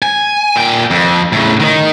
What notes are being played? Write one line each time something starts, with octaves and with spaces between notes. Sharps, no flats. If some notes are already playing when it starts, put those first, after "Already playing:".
G#5
A#2 G5
F2
A2 C#3
D#3 D#4